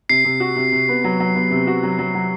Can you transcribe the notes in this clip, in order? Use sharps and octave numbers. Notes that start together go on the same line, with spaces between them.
C3 C7
C3
F#4
C3
C3
B3
F#3
F#3
B3
C3
F#4
F#3
F#3
F#3